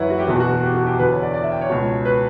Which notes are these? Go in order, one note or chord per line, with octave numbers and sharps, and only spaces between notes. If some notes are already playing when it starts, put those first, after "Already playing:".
Already playing: F#2 E3 E4 B4 C#5 F#5
F#4
G4
E2 B2 F#4
F#4
F#4
G4
F#4
G4
E2 D3 B4
C#5
D5
D5
E5
G5
C#5
C#2 B2
B4